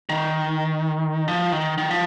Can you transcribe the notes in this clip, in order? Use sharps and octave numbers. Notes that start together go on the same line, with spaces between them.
D#3
F3
D#3
D#3
F3